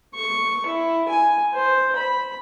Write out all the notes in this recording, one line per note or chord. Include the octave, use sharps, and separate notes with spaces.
C#6
E4
G#5
C5
B5